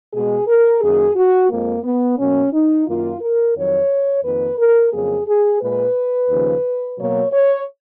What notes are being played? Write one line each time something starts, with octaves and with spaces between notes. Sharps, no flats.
B2 G#3 G#4
A#4
F#2 D#3 A#3 G#4
F#4
F2 F3 G#3 A#3
B3
B2 F#3 A#3 C#4
D#4
F#2 D#3 A#3 F4
A#4
F2 D#3 F#3 C#5
F2 D#3 A#3 B4
A#4
F2 C#3 F#3 A#3 G#4
G#4
A#2 G#3 B4
D#2 C#3 F3
B2 F#3 A#3 C#5
C#5